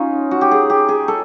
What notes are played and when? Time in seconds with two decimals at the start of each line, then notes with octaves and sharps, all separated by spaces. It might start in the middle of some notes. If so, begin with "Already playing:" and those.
Already playing: C#4 D#4 F4
0.31 F#4
0.41 G4
0.51 G#4
0.70 G4
0.88 G#4
1.08 A4